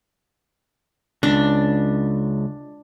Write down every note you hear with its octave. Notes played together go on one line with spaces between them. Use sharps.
C#2 D4